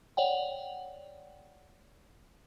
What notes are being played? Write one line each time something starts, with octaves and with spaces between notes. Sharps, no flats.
C#5 D5 F#5 G5